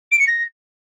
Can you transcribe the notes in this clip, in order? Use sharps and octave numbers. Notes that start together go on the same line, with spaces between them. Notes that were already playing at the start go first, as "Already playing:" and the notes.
D7
C#7
A#6